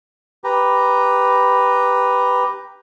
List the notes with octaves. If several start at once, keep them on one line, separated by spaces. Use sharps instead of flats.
G4 B4 A#5